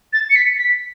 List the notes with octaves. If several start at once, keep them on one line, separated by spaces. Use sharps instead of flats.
A6
C#7
B6
B6